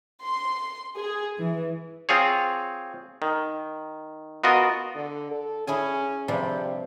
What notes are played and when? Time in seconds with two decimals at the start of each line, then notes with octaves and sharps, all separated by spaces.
0.23 C6
0.95 G#4
1.38 E3
2.09 C4 F4 G#4 C#5
3.22 D#3
4.44 B3 F4 F#4 A#4 D#5
4.96 D3
5.31 A4
5.67 C#4 E4 G#4 G#5
6.28 G2 C3 F3 G3